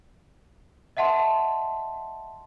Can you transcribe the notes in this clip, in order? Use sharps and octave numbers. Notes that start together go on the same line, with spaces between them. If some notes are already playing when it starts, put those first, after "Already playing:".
D#5 E5 F#5 A5 C6